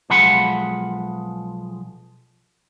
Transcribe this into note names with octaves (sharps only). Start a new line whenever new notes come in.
B1 F3 G#3 F#5 B5